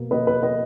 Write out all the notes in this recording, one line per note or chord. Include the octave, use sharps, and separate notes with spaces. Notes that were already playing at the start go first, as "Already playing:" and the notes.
Already playing: B2 A#3
B2 A#3 B4 D#5
B4
B4 D#5